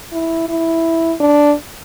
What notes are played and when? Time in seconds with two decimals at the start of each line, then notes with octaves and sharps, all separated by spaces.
0.12 E4
0.49 E4
1.21 D4